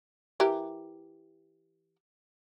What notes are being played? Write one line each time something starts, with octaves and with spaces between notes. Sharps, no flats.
E3 G4 A#4